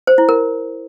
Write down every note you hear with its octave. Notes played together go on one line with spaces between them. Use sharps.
C5
E4
A#4